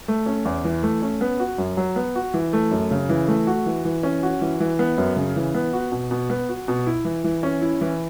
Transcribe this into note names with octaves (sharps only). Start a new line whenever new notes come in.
A3
C#4
E2
E3
A3
C#4
B3
F#4
F#2
F#3
B3
F#4
E3
A3
F#2
C#3
E3
A3
F#4
E3
E3
C#4
F#4
E3
E3
B3
F#2
C#3
E3
B3
F#4
B2
B2
B3
F#4
B2
E4
E3
E3
C#4
E4
E3